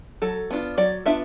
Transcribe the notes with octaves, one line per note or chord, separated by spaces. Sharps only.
F#3 A4
B3 D4 F4
F#3 D5
B3 D4 F4 E5